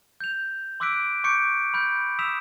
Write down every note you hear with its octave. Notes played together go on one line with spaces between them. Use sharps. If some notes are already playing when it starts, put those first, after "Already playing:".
G6 F7
C6 D6 E6 F#6 B6 D7
C#6 D6 G6 C#7 D7
B5 F6 G6
D#6 E6 B6 E7 F7